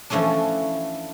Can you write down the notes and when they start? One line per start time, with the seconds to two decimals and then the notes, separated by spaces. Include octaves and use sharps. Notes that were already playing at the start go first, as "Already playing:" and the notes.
0.10 E3 F3 A3 C#4 D4